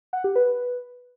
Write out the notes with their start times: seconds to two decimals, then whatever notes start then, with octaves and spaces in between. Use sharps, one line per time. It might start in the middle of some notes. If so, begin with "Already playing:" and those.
0.13 F#5
0.24 G4
0.36 B4